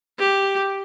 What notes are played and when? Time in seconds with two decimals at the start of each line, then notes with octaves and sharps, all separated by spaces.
0.19 G4